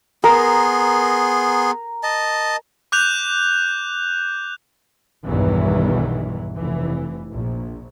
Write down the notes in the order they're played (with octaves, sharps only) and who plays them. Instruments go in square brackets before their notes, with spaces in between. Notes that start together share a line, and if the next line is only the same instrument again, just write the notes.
[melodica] B3 G#4 C6 [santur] A#4
[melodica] D#5 A5
[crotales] D6 F#6 G6 F7
[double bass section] B1 E2 G2 D#3 E3 F#3
F1 E3
A#1